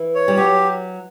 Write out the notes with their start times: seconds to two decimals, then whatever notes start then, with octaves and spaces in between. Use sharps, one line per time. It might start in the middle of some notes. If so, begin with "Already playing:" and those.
Already playing: E3
0.15 C#5
0.28 G3
0.37 F#3 G4